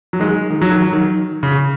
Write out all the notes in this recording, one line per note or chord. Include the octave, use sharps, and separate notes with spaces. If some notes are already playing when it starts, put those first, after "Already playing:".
F#3
D#3 G#3
D#3
F#3
D#3
F#3
D#3
C#3